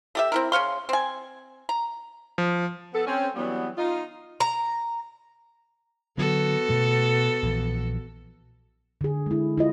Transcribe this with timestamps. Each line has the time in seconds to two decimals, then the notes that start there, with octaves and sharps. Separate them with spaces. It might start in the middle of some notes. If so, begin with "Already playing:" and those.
0.15 A3 G4 E5
0.32 C4 E4 A#4
0.52 C#3 C#5 F5 C6
0.89 C4 G#5
1.69 A#5
2.38 F3
2.93 B3 A4
3.06 C4 C#4
3.35 E3 F#3 G3 B3
3.77 D#4 F4
4.40 A#5
6.18 D3 F#3 B3 F#4 A4
6.69 B2 A3
7.42 A#1 E3
9.01 D3 G#4
9.26 G#3 E4
9.58 E4 F4 D#5